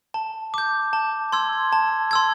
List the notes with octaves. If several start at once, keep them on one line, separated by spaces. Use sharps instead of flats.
A5
D6 G6
A5
C6 E6 G#6
A5
C6 E6 G#6